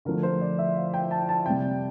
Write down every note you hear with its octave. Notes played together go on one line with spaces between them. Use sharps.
D3 F3 A3 A#4
C5
D5
E5
F5
G5
A5
A5
C3 G3 G5